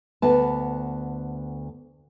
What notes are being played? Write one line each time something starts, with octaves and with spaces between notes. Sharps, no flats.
D2 B3 A5